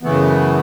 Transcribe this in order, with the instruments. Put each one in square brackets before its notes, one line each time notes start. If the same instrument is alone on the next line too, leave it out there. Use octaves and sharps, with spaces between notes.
[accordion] F#2 C#3 E3 A3 B3